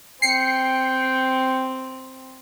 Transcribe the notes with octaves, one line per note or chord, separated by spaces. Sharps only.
C4 G5 C7 C#7